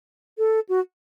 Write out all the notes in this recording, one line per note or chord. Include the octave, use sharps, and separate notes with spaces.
A4
F#4